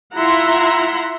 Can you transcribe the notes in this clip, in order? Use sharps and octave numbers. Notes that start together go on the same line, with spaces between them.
E4 F4 E5 F#5 A#5 C6